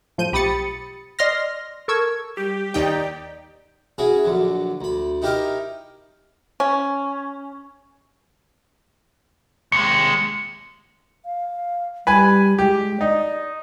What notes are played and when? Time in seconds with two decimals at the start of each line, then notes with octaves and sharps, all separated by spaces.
0.18 A2 F3 G6 D#7
0.32 B1 G4 B5 D#6 A6 C#7
1.19 D5 D#5 C6 F6 A#6
1.88 A4 A#4 C#6 E6 G#6
2.37 G3 G4
2.74 D#2 D#4 D5 G5
3.98 C#4 E4 F#4 G#4
4.24 A#1 D3 F#3
4.81 D2 B5
5.22 D#4 E4 G4 A#4 D#5 F5
6.60 C#4
9.72 D#2 G#3 C#7
11.25 F5
12.07 G3 B4 G#5
12.59 G#3 G4
13.01 D#4 D5